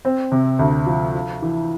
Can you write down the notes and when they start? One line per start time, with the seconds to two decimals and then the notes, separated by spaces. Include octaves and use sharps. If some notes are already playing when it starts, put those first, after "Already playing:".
0.05 C4
0.32 C3
0.59 D2
0.86 F3
1.15 F4
1.42 E3